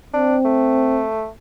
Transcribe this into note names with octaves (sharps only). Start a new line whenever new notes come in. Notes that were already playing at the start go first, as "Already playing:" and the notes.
C4 D4
A3